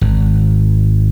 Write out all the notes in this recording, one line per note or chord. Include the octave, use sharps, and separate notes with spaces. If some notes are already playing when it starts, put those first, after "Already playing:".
G#1